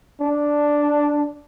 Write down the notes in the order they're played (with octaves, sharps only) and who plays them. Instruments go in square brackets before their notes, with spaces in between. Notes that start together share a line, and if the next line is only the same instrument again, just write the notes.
[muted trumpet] D4